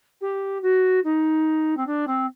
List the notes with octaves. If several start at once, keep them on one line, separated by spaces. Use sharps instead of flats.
G4
F#4
D#4
C4
D4
C4